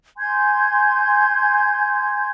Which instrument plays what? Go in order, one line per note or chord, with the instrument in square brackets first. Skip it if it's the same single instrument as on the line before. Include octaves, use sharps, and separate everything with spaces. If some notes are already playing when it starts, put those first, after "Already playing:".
[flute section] G#5 C6 G6 G#6